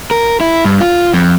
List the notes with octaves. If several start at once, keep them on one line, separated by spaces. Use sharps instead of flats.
A#4
E4
G2
F4
F2